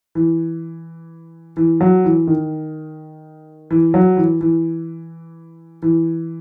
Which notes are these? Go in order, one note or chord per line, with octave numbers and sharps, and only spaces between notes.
E3
E3
F#3
E3
D#3
E3
F#3
E3
E3
E3